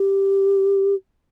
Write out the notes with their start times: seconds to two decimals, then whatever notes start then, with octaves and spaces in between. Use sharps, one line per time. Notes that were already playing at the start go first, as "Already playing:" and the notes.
Already playing: G4